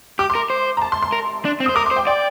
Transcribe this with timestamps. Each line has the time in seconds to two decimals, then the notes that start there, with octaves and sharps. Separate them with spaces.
0.19 G4 D6
0.30 C6
0.35 A#4
0.50 C5
0.77 A#5
0.82 A5
0.92 C6
1.03 C6
1.12 A#4
1.45 D4
1.60 C4
1.66 C5 D#6
1.76 A#4 D6
1.86 C6
1.91 C5
1.96 G5
2.07 D5 G5